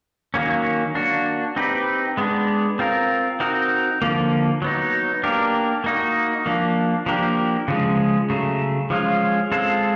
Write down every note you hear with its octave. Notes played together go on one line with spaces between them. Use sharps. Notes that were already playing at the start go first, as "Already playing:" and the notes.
D#3 F#3 A#3 C#4
A#3 D4 F#4
C4 D#4 G4 B4
G#3 B3 D4
C4 F4 A#4
C4 D#4 F#4 A#4
D3 F3 A#3
F#3 B3 D#4
A#3 D4 G4 A#4
A#3 D#4 F#4
F3 A#3 D4
F3 A#3 D4 G4 A#4
C#3 F3 G#3
C#3 F#3 A3
F3 G#3 C#4 F4
G#3 C4 F4 A4 C5